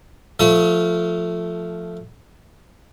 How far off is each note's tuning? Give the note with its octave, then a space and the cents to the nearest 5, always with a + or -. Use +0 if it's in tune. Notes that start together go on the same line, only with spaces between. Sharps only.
F3 +0 A3 +0 D#6 +45